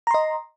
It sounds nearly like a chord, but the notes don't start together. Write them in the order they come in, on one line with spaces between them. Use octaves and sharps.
A#5 C6 D#5